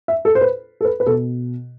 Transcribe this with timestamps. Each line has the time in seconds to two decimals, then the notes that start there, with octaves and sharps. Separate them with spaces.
0.08 E5
0.25 A4
0.35 C5
0.41 B4
0.81 A4
0.85 B4
1.00 B4
1.06 B2 A4